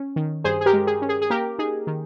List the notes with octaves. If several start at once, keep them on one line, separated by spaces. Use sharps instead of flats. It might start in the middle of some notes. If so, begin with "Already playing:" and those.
Already playing: C#4
D#3
G2 G#4 C5
G#4
G4 A#4
G#3
G#4
C#4
G#4
G#4
A#3 G4 A#4
D#4 G#4
D#3